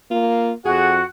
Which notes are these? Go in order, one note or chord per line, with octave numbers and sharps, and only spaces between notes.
A#3 F4
F2 F#4 G#4 F#5